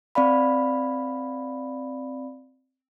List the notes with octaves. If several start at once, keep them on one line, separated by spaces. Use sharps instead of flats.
C4 D5 F5 B5